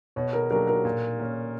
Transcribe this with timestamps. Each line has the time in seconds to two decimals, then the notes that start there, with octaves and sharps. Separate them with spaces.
0.16 B2 C#5
0.33 A#4
0.51 F#3 A#3 D4 G4 A#4
0.67 A#4
0.85 A#2
1.20 A#3 C#4